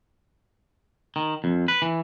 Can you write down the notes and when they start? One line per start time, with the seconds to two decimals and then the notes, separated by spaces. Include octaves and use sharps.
1.16 D#3
1.44 F2
1.68 B4
1.82 E3